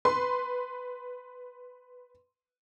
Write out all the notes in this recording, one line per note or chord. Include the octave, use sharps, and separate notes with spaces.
B4 C6